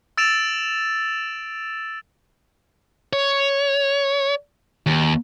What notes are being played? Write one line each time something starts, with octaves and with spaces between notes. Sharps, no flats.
E6 A6 D7 E7 F7
C#5
D#2